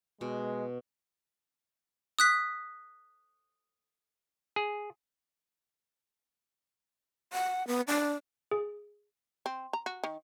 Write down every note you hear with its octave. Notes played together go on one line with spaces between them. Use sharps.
B2 G#3
D#6 F#6 B6
G#4
F#5
B3
D4
G#4
C4
A#5
F#4
D#3